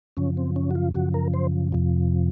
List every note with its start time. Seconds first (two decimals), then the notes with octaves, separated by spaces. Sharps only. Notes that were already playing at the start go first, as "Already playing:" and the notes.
0.17 F#2 C#3 F3 C#4
0.37 C4
0.56 C#4
0.71 F#4
0.75 F4
0.94 F#2 C#3 F3 F#4
1.14 A#4
1.34 C5
1.72 F2 C3 F3